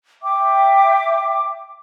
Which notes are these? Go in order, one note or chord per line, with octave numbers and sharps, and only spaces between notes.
E5 G5 D6